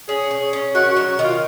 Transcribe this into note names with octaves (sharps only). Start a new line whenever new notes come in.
C#4 G#4
C#4
C#4
D#3 F#4
F#4
F#3
F#4
D#3
F4